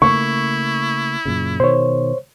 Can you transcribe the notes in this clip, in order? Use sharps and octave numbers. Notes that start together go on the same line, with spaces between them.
C#3 A3 A#3 E4 C#6
F#2 A#2 C#3
B2 D#3 C5 C#5